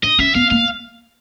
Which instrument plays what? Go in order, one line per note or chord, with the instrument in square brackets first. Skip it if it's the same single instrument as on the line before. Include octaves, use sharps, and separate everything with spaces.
[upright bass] D4 [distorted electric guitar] D#5
[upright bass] C#4 [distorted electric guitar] E5
[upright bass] B3 [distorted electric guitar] F5
[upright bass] A#3 [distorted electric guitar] F5